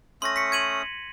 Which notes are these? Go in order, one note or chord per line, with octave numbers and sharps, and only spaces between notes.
A3 C#4 C6 D#6 A#6
B6 C#7
G#6 D#7 F#7